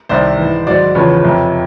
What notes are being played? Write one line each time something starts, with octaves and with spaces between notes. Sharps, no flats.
C2 C3 D#3 C5 D5
G#2 E3
G#2 D#3 F#3 C5 D5
E2 C#3 F3 B4 C#5
F2 C3 F3